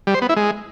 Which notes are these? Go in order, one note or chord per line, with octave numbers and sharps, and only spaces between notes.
G3
C5
B3
E4
G#3